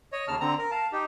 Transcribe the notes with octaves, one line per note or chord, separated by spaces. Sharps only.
C#5 D#5
D#2 C#3 A5 F6
D3 C4 A#5
A#4
F5 A5
D#4 G4